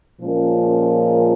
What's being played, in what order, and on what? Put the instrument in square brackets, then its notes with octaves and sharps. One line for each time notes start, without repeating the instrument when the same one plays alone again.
[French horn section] A#2 F3 G#3 C#4 A#4